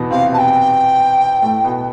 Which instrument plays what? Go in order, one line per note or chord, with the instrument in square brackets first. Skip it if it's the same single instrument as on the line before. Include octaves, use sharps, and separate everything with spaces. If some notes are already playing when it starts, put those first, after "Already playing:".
Already playing: [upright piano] E2 B2 E3 B3
[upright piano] C3 C4 [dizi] F5
[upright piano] B2 B3 [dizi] A5
[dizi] G5
[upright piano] A2 A3
B2 B3